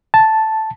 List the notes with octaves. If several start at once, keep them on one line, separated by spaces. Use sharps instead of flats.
A5